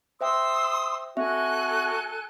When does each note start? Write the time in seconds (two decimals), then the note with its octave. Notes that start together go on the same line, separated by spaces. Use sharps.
0.21 C5 E5 G5 C6 D#6 E6
1.17 C4 F#4 A4 E5 G#5 F#6